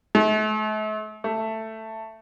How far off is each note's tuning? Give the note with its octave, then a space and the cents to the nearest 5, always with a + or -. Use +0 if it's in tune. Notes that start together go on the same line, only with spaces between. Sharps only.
A3 -40
A3 +10